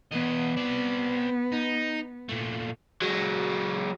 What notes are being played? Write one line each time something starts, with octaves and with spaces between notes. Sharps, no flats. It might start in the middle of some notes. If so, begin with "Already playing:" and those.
E2 B3 D#5
C4 D5
D#4
A#2 A3
F#3 G#3